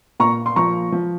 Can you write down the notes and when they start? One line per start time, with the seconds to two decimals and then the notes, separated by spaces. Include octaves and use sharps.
0.20 A#2 A#5 C#6
0.46 C6
0.56 F3 A#5 C#6
0.92 F3